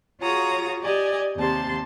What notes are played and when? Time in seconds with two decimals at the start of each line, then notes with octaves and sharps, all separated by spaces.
0.21 F4 F#4 G#4 C#5 A#5 D#6
0.81 G4 D5 D#5 G#5
1.36 D#2 C3 A5 C6